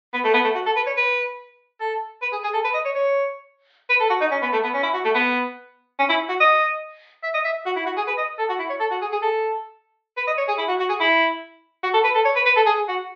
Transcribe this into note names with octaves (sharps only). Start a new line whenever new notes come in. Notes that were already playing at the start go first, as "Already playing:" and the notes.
B3
A3
B3
A3
F#4
A4
B4
C#5
B4
A4
B4
G#4
G#4
A4
B4
D#5
C#5
C#5
B4
A4
F#4
D#4
C#4
B3
A3
B3
C#4
E4
F#4
A3
B3
C#4
E4
F#4
D#5
E5
D#5
E5
F#4
E4
F#4
G#4
B4
D#5
A4
F#4
E4
C#5
A4
F#4
G#4
G#4
A4
B4
D#5
C#5
G#4
E4
F#4
F#4
G#4
E4
F#4
A4
B4
A4
C#5
B4
B4
A4
G#4
F#4